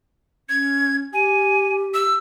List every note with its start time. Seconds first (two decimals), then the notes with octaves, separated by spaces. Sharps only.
0.49 C#4 G#6
1.13 G4 G#5
1.94 E6